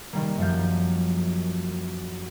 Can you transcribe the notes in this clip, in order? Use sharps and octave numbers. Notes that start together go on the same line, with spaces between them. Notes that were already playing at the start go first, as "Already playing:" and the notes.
D#3 G3 A#3
F#2 F3 G6